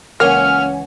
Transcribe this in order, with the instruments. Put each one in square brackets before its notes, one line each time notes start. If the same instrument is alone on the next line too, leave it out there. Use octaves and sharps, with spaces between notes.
[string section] C#2 C#4 [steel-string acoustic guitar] E3 F#5 G#5 [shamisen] A#3 [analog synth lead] F6